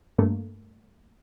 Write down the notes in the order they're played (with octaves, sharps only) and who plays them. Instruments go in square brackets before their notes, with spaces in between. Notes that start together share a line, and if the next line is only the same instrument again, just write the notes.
[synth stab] G2 A3 A#3